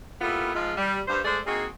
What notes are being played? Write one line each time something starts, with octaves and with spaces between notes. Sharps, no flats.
G3 A#3 B3 E4 F4 A4
G#2 F3 G#3 F4
G3
G2 C5
G#3 A3 G#4 C5 D5
A#3 C4 D#4 F#4 G#4